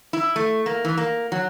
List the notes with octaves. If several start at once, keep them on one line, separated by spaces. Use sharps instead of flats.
E4
A3
A#3
E3
A#3
F#3